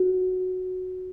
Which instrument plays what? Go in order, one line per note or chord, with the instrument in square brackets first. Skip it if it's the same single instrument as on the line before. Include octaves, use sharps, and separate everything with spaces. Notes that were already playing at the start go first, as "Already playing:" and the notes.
Already playing: [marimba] F#4